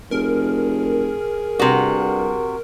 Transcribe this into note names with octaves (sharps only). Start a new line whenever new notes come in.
F1 G#4 A#4
G2 C3 F#4